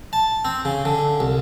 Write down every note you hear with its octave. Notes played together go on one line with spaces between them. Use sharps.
A5
C4
C#3
D3
C2